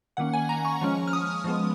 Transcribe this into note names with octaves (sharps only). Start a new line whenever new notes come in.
D#3 A#3 C#4 F#5
G#5
A#5
C#6
F3 G#3 C#4
F6
D#6
F3 G#3 B3